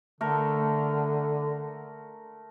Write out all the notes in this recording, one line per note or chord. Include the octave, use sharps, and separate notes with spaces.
D3 A3 A#4